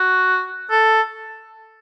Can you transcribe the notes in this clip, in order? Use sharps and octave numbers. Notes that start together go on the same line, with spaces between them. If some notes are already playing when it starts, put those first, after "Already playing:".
Already playing: F#4
A4